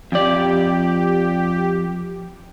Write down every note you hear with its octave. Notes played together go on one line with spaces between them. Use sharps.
F2 G4 D5